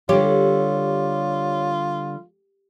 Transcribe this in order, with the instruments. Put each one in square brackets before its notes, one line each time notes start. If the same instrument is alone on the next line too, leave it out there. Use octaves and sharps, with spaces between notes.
[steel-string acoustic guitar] D3 G3 [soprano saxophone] F4 [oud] G4 [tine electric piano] C#5